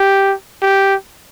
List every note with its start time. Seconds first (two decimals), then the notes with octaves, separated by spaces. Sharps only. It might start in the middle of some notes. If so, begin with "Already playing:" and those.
Already playing: G4
0.62 G4